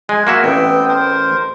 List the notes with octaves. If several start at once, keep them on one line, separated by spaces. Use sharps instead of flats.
G#3 G#5
A#3 F#4 E5
A1 B3 C4 G5
A#4 C5